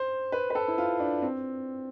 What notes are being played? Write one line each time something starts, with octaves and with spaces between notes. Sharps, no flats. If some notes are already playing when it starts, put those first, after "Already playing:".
Already playing: C5
B4
B4
A4
E4
F4
D4
C4